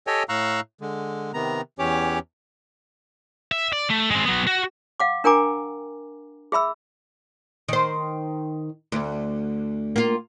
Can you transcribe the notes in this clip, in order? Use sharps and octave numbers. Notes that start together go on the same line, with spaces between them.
G4 A4 C#5 D#5 G5 G#5
A2 F5 A#5 C#6 E6 F#6
D3 G#3
C3 D#3 B3 A#5
E2 E3 C#4 G4 C#5 D6
E5
D5
A3
G#3 C4
F#3 B3
F#4
F5 F#5 D6
D4 A#4 G5 G#5 A#5 D6
G#4 E5 B5 E6
D#3 C5
D2
A#3 F4